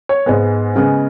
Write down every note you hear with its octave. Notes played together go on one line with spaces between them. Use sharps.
C#5
G#2 G#3 B3
C#3 G#3 B3